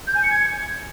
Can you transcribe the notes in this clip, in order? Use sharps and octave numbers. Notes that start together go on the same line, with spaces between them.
G6
G#5
C#7
G#6